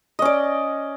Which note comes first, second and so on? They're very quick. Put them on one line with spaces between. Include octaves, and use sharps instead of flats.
D#5 C#4 D5